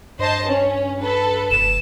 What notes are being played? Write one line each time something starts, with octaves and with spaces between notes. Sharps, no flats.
G2 C5 D#5 A5
C#4
A4 B4
F1 E7